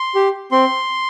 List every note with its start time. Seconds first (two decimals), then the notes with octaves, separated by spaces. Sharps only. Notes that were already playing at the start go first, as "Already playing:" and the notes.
Already playing: C6
0.15 G4
0.52 C4 C6